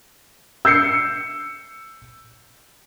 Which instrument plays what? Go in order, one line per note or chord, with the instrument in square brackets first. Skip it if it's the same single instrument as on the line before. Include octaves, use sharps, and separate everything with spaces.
[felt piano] E6 G6 C7 C#7